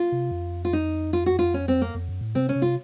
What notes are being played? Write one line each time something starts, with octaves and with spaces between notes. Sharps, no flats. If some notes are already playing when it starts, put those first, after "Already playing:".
Already playing: F4
C3
F2
F4
D#4
F4
F#4
F4
C#4
C4
A#3
F2
F#2
A2
C3 C4
C#4
C3
F4